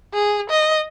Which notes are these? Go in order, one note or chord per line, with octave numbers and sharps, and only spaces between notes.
G#4
D#5